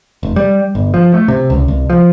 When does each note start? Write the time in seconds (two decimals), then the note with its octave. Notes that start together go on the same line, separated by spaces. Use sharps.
0.23 F1
0.36 G3
0.75 G1
0.94 F3
1.14 A3
1.28 C3
1.50 C#2
1.68 C2
1.90 F3